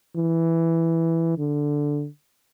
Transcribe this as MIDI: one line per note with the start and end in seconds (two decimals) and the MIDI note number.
0.17 1.38 52
1.38 2.07 50